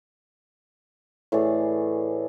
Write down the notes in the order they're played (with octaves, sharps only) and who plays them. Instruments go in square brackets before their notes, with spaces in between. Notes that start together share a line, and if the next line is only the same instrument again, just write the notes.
[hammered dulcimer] A2 E3 G#4 D5